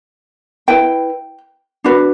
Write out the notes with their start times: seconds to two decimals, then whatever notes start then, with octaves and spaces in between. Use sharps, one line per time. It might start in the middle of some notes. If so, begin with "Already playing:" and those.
0.68 E4 B4 G5
1.84 D4 F#4 B4